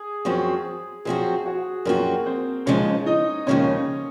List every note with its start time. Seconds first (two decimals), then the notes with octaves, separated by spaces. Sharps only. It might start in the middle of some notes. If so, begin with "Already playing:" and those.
Already playing: G#4
0.25 F#2 F3 C4 F#4
1.05 F#2 F3 C4 F#4 G#4
1.46 F#4
1.85 F#2 F3 A#3 C4 F#4 A#4
2.26 C4 C5
2.66 D#2 C#3 F3 G#3 C#4 D#4 C#5
3.06 D#4 D#5
3.47 D#2 C#3 F3 G#3 C#4 D#4 C#5